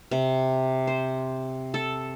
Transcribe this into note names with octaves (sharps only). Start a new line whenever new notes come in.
C3
C5
A4